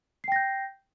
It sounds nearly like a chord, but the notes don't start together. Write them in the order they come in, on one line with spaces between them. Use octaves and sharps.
C7 G5 A#6 G6